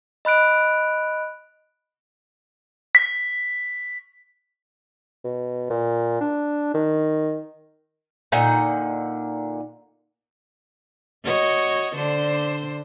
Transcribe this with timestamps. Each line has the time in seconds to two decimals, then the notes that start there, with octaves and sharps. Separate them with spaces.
0.25 D#5 B5 F#6 D7
2.95 B6
5.24 B2
5.70 A#2
6.21 D4
6.74 D#3
8.32 A#2 D3 D#4 F#5
11.23 F#4 C#5 D#5
11.95 D3 D4 C5